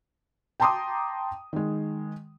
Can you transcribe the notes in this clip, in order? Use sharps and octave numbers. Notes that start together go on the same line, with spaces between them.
G5 A5 A#5 C6 D6 D#6
D#3 G#3